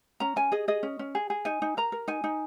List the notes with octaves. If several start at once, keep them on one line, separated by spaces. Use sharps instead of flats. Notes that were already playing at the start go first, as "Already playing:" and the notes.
C#4 A#5
C#4 G#5
G#4 D#5
G#4 D#5
C#4
C#4
G#4
G#4
D#4 G#5
D#4
A#4 A#5
A#4
D#4 G#5
D#4